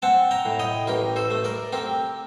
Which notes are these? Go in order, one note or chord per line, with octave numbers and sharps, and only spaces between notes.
C4 F#5 A5
G5 A#5
A2
D#5 G5
A1 G4 A#4
A4 C5
A3
A#4 D5
C4 G4 A#4